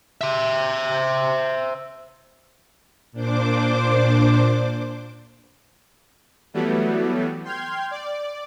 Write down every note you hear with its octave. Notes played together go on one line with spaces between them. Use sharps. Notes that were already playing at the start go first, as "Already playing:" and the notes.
C5 E5
A#2 D4 C5 D6
E3 F#3 G3 A3 B3
G5 C6 F6 G6 G#6
D5